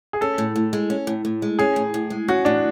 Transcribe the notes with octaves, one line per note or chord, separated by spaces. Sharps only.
G#4
C#4 A4
A2
A2
G#3
C#4
A2
A2
G#3
C#4 G#4
A2
A2
G#3
C#4 F#4
A2 D4